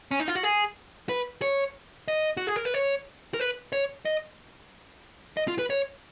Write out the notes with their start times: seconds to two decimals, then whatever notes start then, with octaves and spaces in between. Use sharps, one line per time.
0.11 C#4
0.20 D#4
0.28 F4
0.35 F#4
0.43 G#4
1.09 B4
1.42 C#5
2.08 D#5
2.37 F#4
2.47 G#4
2.56 A#4
2.65 B4
2.74 C#5
3.34 A#4
3.40 B4
3.72 C#5
4.05 D#5
5.37 D#5
5.48 F4
5.59 B4
5.70 C#5